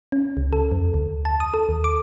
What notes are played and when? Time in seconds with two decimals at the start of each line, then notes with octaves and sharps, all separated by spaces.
0.12 C#4
0.37 C#2
0.53 A4
0.72 F2
0.94 D2
1.25 A5
1.40 D#6
1.54 A4
1.69 D#2
1.84 D6